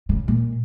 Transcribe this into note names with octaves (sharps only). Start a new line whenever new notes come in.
C#3
A#2